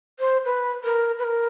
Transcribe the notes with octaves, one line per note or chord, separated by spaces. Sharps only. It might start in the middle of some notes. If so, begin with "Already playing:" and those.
C5
B4
A#4
B4
A#4